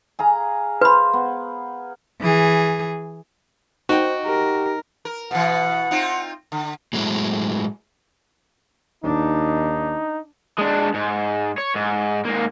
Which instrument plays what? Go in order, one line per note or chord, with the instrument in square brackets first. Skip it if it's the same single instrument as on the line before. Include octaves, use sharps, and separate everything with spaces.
[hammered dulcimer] G#4 F5 A#5
[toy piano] B4 B5 [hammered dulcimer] C5 F5
[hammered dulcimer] B3
[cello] E3 G#4
[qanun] D#4 [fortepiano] F#4 G5 [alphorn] C5
[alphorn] G4 [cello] A#4
[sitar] A#4
[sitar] B2 E3 [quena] F#5
[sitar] C4 D#4 F4
D3
[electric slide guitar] A2 F#3 G#3 E4
[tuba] D#2 [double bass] D4 [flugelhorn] D#4
[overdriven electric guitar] G#3 D4
G#2
C#5
G#2
G#2 A#3